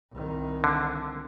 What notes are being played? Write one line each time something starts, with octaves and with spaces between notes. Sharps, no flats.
C2 D#3
D3